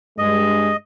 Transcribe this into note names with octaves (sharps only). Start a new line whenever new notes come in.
G2 G#3 D#5